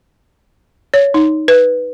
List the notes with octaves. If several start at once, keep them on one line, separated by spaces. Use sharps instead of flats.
C#5
D#4
B4